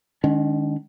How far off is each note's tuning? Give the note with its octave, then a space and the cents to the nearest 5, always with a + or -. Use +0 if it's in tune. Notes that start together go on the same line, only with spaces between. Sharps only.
D#3 -35 G#3 +0 C#4 +35